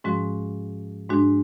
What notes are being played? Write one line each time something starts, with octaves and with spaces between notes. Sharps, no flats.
G#2 F3 G#3 C#4 F#4
G#2 G#3 D4 F#4